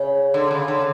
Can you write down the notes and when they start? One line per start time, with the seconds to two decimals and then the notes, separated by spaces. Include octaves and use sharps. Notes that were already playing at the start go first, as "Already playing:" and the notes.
Already playing: C#3
0.34 D3
0.51 C#3
0.68 D3